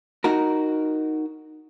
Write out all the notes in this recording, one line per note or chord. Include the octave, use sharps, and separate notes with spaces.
D#4 F#4 A#4